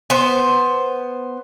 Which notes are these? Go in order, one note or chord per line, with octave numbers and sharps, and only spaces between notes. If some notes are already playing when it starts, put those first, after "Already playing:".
B3 C5